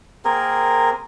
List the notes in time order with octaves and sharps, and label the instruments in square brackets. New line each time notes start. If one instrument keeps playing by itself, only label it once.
[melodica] A#3 C4 G#4 A#4